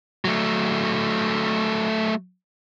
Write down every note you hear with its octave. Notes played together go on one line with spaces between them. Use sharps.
F#3 A3